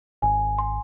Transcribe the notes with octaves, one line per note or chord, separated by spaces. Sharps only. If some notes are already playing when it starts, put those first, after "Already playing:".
G#1 G#5
C6